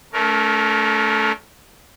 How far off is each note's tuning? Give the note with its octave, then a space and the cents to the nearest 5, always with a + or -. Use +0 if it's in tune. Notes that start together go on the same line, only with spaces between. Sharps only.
A3 -10 C#4 +40 A#4 +15